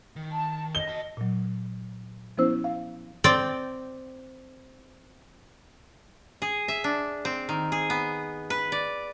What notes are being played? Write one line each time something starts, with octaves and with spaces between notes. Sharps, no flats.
D#3
A5
D#5 G7
F#4 A5
A#2 F#3
F3 B3 C#4 E4 C5 E6
F5
C4 D5 G5
G#4
E5
D4
C4
D#3
G#4
B3
B4
D5